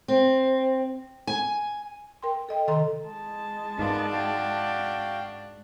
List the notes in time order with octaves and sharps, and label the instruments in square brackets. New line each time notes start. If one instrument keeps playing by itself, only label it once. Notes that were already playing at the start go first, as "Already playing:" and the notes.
[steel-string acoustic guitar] C4
G#5
[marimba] A#4 G5 C6
A4 D#5 G5
C3 D#3 A4 D#5 A#5 C6
[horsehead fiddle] G#3 A5
[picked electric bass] G#2 [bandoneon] B3 F4 A#4 [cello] D4
[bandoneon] F#4 F5 G5